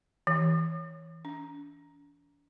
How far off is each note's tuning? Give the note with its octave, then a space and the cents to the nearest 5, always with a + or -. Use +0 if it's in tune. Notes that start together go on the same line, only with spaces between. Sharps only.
E3 -15
D4 -45